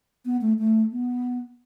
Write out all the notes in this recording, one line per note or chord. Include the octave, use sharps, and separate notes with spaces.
B3
A3
A3
B3